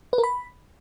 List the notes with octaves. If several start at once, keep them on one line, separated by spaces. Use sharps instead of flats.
B4
A#4
B5